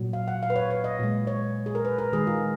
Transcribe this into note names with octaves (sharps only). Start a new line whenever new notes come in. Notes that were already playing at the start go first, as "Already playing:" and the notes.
Already playing: A#2 F#3
F5
F#5
F5
B4
C#5
C#5
D#5
A#2 G#3
C#5
G#4
A#4
B4
A#4
D#3 G#3 G#4
F4